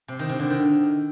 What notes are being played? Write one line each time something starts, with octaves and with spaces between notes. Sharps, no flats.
C3
D#3
C3
D3
D#3